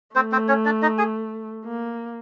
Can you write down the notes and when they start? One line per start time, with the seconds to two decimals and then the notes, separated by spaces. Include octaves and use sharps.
0.15 A3 C4 C5
0.32 C4 C5
0.48 C#4 C#5
0.65 D4 D5
0.82 D#4 D#5
0.98 G#4 G#5
1.65 A#3